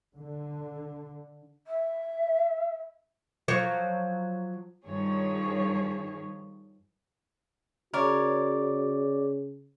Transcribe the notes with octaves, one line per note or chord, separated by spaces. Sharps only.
D3
E5
F3 F#3 C#5
G2 D#3 F3 G#4 C#5
C#3 F#4 A#4 C#5 D5